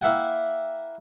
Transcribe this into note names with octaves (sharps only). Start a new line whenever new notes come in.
A#3 E4 E5 F#5 G5